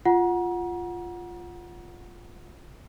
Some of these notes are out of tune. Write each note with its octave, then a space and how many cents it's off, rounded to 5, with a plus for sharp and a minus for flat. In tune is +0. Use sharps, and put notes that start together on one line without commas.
F4 +0 F#5 -10 A#5 +35